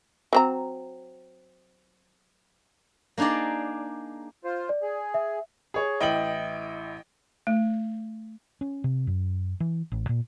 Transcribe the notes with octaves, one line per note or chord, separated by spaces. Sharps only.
F#3 C4 A#5
A#3 D4 D#4 G#4 D5
F4 C5
D5
G#4
E5
G#4 C#5
A1 E4 D#5 G5 F#7
A3
C#4
C3
F#2
E3
A1
A#2